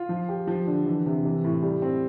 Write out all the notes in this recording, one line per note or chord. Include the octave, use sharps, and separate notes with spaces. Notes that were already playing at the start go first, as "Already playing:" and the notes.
Already playing: F4
F3
G4
F3
D3
E3
C3
E3
A2
G3
C4